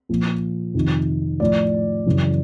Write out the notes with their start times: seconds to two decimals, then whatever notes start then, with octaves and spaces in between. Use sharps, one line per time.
0.09 A#2 F3
0.74 F2 C3 D#3
1.40 A2 F3 D5
2.06 F#2 C#3 E3